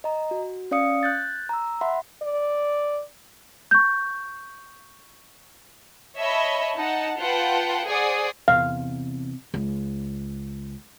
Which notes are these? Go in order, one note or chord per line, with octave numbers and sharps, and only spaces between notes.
D#5 A#5
F#4
C#4 D5 F5 D#6 C#7
F#6 G6 A6
A#5 E6
E5 F#5 B5 C6
D5
C#6 G6
C#5 D#5 E5 A5 B5
D#4 F#5 A5
F4 B4 F#5 G5 A5
G#4 C5 D5 F#5 D#6
E2 C3 F5
C#2